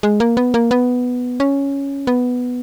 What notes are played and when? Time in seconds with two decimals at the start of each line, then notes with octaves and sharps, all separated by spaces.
0.03 G#3
0.20 A#3
0.37 B3
0.54 A#3
0.71 B3
1.40 C#4
2.07 B3